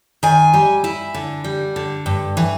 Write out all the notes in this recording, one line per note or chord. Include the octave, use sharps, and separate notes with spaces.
D#3 G#5
G3
E4
D3
G3
D3
G2
E3